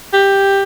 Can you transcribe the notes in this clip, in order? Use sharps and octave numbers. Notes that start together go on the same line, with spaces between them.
G4